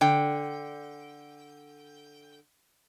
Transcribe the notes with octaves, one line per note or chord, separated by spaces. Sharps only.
D3 G5